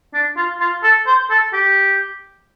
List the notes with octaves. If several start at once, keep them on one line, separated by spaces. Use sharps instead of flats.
D4
F4
F4
A4
C5
A4
G4